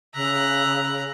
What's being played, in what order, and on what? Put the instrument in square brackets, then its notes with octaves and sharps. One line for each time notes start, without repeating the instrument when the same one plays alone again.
[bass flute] C#3 [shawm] E5 [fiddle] A#5 F#6